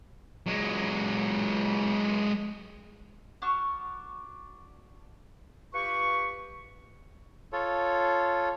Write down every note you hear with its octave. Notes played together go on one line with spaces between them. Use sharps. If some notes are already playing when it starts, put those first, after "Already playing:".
F#3 G#3
D4 F#4 C#6 F6
F4 G4 B4 C#6
F4 A4 C#5